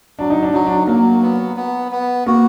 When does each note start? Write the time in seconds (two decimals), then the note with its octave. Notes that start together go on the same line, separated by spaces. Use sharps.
0.19 F#3 D4
0.30 D#4
0.43 D4
0.54 F#3 D#4
0.67 D4
0.87 F#3 A#3
1.23 B3
1.57 B3
1.92 B3
2.26 A#3 F#4